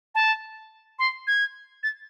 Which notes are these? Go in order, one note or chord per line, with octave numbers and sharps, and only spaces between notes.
A5
C6
G#6
A6